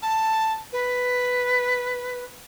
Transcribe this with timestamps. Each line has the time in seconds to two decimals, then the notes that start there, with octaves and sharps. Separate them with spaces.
0.02 A5
0.73 B4